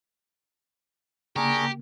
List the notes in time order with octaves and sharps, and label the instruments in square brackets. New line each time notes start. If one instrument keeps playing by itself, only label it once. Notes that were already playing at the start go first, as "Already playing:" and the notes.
[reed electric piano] C#3 A#3 [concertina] D4 A#4 A#5 [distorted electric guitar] G4 [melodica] G#4 C#6